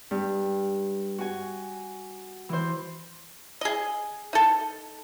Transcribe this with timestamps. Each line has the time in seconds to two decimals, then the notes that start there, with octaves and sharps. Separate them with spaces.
0.11 G2
1.18 F#4 G#5
2.49 E3 C5
3.61 G#4 D#5
4.33 D#4 A4